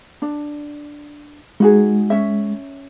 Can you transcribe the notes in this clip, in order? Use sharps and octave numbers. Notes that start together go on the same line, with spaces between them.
D4
G#3 D#4 F#4 G#4
C#4 C#5 E5